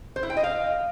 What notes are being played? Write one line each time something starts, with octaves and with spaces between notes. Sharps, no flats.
C5
E4
G5
D#5
F5